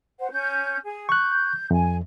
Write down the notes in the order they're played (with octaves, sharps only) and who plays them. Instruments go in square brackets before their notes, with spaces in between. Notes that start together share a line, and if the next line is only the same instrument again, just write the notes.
[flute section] C5 F#5
C#4 G6
G#4
[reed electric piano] C#6 F#6 [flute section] G6
[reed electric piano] F2 [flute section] G#5